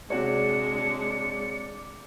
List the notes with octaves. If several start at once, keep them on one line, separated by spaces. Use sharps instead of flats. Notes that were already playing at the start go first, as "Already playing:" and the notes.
C3 G#3 D4 F#4 C#5 D5 C#7